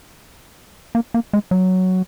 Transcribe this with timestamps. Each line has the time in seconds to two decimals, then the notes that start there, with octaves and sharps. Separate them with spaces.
0.95 A#3
1.14 A#3
1.33 G#3
1.51 F#3